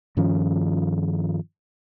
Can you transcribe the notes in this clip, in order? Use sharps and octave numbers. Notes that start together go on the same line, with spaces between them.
G2 D#3 F3 C#4